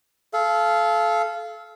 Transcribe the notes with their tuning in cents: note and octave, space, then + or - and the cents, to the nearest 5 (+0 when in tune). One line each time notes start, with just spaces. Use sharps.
A4 -30 F5 -20